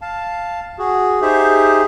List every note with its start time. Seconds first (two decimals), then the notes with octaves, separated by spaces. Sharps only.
0.02 F5 A5
0.79 F#4 G#4
1.22 D#4 G4 G#4 C5 E5